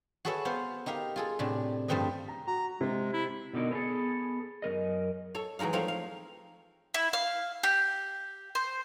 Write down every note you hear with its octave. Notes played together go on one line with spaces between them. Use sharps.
F#4 G#4 A4 B4 C#5 E5
B3 C5 F5
D#4 G4 A#4 F5
F4 G#4 A4
A2 C3 D4
G2 F3 A3 C4 B4 D#5
A#5
F#4 A#5
C3 G#3
E4
B2 D3 D#4 A#4
B3 C#4 E4 G#4 A4
F#2 G3 A#4 D#5
A4 C#5
E3 F#3 G#3 D#4 F5
F3 A3 C4 D#4 C#5 F5
F5
E4
F5
G4
C5